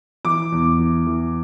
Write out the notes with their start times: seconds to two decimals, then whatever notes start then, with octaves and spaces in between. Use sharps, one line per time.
0.25 E3 D6
0.52 E2
0.79 E3
1.07 E3